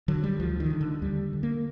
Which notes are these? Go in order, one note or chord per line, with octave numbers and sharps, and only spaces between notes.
D3 F#3
G3
D2 F3
D#3
D3
D3
D#2 G3
D3
A#3